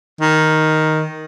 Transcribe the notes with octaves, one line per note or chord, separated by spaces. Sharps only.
D#3